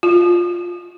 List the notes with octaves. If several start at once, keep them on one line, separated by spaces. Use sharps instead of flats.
F4